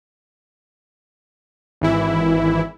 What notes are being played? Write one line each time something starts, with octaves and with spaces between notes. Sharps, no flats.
G#1 E3 E4